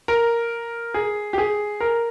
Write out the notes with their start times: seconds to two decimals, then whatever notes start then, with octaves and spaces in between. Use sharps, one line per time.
0.08 A#4
0.94 G#4
1.33 G4
1.38 G#4
1.80 A#4